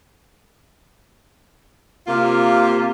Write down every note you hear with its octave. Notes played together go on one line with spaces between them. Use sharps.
C3 A#3 F4